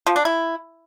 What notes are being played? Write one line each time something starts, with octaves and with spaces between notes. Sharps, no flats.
F3
D4
E4